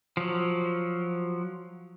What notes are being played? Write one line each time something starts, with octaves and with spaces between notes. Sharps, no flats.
F3 F#3